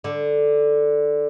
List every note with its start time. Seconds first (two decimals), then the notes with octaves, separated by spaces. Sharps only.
0.04 D3